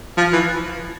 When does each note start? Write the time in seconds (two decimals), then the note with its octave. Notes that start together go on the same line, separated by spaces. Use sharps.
0.17 F3
0.33 E3